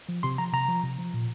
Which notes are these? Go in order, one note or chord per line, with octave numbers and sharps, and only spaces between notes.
F3
C3 C6
F3 A#5
C3 A#5
F3
C3
F3
A#2